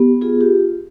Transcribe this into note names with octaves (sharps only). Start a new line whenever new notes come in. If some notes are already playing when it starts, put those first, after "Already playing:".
Already playing: B3 G4
F4 G#4
G4